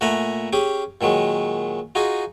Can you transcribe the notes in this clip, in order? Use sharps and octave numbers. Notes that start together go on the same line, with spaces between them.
A#2 A3 F#5 G#5 A#5 B5
C#4 G4 G#4
A#2 D#3 F#3 G#3
D#4 F4 F#4 G#4 G#5